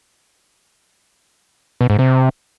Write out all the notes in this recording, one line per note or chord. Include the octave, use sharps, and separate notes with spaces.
B2
G#2
C3